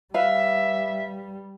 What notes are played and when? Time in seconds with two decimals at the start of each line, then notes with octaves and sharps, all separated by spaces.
0.14 G3 B4 E5 F5